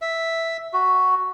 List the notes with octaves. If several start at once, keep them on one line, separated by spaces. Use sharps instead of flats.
E5
F#4